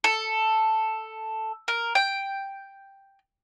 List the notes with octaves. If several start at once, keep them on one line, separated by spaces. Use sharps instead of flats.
A4
A#4
G5